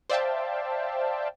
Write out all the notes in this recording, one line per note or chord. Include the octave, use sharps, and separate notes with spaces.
C5 D5 E5 F5 G5 A5